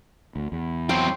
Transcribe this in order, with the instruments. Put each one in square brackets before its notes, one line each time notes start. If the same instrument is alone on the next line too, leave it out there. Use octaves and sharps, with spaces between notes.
[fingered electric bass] D2
E2
[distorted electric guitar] F#3 C4 [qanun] G5 C6